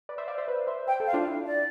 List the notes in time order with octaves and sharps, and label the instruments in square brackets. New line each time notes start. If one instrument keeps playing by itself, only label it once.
[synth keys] B4 D5
C5 E5
D5 F5
C5 E5
B4 D5
C5 E5
[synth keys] C5 E5 [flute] G5
[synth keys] A4 C5
[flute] F5
[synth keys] D4 F4
E4
[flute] D5